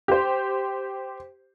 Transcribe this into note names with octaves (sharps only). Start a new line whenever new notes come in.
G4 C5